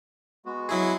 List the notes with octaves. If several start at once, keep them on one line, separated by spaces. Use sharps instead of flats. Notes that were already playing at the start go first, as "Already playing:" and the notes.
G#3 B3 F#4
F#3 E4 G#4